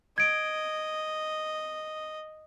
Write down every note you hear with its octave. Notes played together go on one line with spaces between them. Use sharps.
D#5 G#6 D7